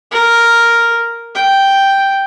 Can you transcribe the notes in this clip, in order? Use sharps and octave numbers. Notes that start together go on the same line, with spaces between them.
A#4
G5